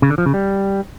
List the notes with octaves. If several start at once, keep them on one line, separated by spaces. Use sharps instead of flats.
C#3
D3
F3
C#3
G3